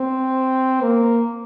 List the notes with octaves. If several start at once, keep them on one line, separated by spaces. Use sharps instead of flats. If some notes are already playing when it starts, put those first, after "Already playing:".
Already playing: C4
A#3